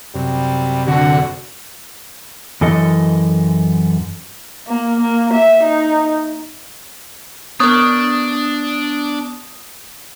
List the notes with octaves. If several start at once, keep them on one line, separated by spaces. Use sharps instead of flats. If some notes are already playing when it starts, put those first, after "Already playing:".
F#2 C3 G3
D3 F#4
F#2 E3 A4 D#5
A#3
A#3
E5
D#4
B3 D4 A#4 C#5 D#6